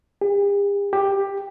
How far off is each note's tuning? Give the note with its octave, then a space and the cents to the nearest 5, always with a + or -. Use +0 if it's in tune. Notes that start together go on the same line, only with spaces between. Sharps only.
G4 +45
G4 +10